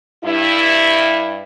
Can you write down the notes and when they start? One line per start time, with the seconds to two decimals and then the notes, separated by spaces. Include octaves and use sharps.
0.25 G2 E4